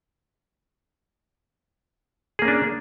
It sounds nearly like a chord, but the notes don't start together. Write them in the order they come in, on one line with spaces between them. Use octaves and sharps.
G#4 A#3 C#4 D4